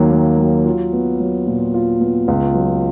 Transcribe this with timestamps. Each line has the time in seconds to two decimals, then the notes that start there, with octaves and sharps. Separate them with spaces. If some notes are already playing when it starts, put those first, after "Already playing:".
Already playing: D#2 D#3 F#3 A#3
0.12 A#3
0.39 F#3
0.66 F4
0.93 B3
1.20 F#3
1.47 A#2
1.74 F4
2.00 B3
2.28 C#2
2.55 F#3